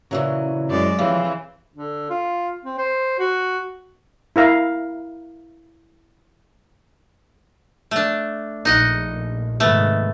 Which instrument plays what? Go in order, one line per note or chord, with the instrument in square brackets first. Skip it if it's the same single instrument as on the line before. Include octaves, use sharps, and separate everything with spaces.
[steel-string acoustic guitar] A#2 E3 F#3 [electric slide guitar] C#3
[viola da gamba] F#2 G#3 D5
[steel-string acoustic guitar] C#3 [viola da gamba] E3 C4 [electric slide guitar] F3 G4
[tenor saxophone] D3
F4
C4
C5
F#4
[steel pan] E4 A#4 F5
[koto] A3 D4
[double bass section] A#1 [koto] D#4 D#5 F#5
[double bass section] G#2 C3 D#3 [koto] A3 B3